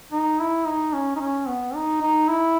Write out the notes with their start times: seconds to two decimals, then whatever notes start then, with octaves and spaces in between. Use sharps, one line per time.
0.12 D#4
0.40 E4
0.66 D#4
0.93 C#4
1.16 D#4
1.20 C#4
1.48 B3
1.75 D#4
2.02 D#4
2.28 E4